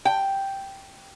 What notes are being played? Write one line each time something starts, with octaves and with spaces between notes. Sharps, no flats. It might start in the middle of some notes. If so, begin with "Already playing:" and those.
G5